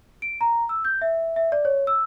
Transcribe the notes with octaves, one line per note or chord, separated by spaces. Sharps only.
D7
A#5
E6
G6
E5
E5
D5
C#5
E6